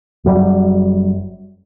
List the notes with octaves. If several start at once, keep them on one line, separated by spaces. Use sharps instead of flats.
F#1 F#2 C#3 G3